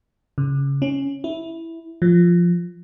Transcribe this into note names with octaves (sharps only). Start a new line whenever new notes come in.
C#3
C#4
E4
F3